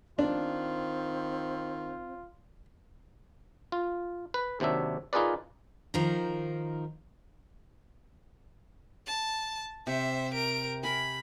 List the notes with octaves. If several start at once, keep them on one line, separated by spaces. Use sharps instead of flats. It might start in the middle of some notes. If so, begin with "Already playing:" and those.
D#3 C4 D4 F4
F4
B4
D#2 C3 F#3 D4 E5
D#4 F4 G#4 A#4 B4 D5
D#3 F3 D#4 A#4
A5
C3 C5 E5
A#4 D7
A#4 G#5 B5